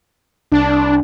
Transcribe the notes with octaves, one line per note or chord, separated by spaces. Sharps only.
C2 D4